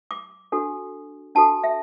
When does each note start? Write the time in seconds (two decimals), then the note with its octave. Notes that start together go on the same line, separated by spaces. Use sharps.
0.11 D6
0.52 D4 F#4 A4
1.35 D4 F#4 A4 A5
1.64 E5